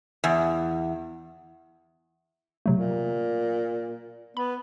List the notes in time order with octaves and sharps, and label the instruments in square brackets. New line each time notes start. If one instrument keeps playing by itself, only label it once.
[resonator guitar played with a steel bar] E2
[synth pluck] C3 F#3 A3
[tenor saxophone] A#2
[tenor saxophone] B3 [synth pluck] B5